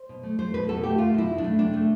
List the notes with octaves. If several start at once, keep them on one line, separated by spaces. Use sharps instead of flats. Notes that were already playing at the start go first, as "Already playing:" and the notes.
Already playing: C5
B2
A3
A3 C5
B2 B4
B2 A4
A3 G4
A3 F4
B2 E4
B2
D4
A3
C3 D4
A3